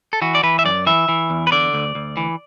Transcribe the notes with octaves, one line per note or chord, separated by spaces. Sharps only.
A4
E3 F#4
D5
E3 B4
E5
F#2 D5
E3 E5
E3
E2
B4
D3 D5
D2
D2
E3